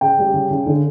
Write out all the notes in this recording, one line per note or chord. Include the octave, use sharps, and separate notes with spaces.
C#3 G5
G3
C#3
C#3
D3